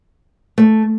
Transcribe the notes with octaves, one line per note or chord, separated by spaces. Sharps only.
A3